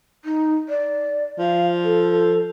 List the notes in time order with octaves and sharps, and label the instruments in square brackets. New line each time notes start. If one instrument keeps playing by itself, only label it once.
[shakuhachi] D#4
D5
[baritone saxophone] F3 [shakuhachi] F5
[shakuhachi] A4